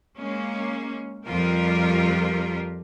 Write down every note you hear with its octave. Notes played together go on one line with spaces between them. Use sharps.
G#3 A#3 C#4
F2 G3 F4 G4 A#4